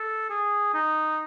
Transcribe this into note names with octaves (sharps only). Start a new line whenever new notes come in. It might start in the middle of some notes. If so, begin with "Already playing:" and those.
Already playing: A4
G#4
D#4